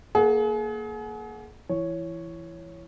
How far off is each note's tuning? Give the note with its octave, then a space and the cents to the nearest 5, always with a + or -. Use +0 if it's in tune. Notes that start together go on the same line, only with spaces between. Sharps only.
A#3 +0 G#4 +35 F#5 +0
E3 +15 C#5 +0